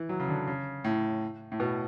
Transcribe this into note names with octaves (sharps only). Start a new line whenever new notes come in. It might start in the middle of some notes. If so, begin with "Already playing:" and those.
Already playing: E3
F#3
C#3
D3
C#3
A2
A2
B2